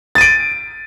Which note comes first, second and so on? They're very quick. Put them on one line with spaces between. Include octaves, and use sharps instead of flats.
A6 D#7 D7